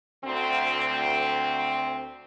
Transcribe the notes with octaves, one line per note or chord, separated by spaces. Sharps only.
D2 C4